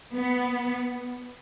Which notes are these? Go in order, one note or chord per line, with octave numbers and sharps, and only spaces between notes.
B3